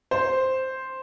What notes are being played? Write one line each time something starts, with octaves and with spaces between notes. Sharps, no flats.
C5